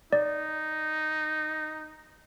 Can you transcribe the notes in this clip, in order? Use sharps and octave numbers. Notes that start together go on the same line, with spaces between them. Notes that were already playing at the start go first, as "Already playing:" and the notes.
D#4 D5